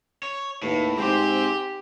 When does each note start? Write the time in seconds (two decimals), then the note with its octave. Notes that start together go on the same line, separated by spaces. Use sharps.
0.23 C#5
0.62 D#2 A2 B4 E5
0.98 G#2 C4 G4 C5 G#5 D6